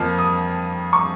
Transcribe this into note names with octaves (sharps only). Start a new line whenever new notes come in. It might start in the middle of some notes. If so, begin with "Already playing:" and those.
Already playing: F2 F3 A#3
D#6
C#6